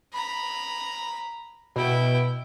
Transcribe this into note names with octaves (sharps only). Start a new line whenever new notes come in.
A#5 B5
B2 E4 G5